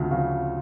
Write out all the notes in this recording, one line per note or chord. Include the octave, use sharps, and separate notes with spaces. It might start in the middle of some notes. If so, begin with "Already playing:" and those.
Already playing: D2 C#3 F3
C#3 F3